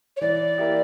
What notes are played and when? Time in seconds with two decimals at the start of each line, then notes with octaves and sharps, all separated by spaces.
0.17 C#5
0.21 E3 D5
0.58 A#3 E4 G4